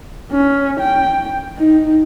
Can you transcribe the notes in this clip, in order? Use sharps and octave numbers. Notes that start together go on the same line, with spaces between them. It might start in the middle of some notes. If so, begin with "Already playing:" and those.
C#4
G5
D#4